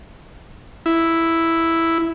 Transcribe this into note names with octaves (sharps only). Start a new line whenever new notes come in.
E4